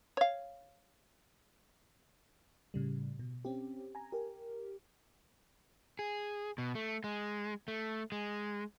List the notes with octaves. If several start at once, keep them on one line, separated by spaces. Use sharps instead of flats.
C#5 F5
A2 C#3 G3
B2
C4 C#4 G4
G#5 A#5
G4 A#4
G#4
B2
A3
G#3
A3
G#3